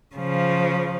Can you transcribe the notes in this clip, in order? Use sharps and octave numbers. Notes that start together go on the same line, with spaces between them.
C#3 F3